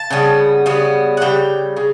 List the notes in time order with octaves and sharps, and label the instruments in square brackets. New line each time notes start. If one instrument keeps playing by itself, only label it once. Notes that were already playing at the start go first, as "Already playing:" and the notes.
Already playing: [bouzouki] A5
C#3 G3 B3
C#3 G3 B3
F#5
C#3 G3 G5
C#3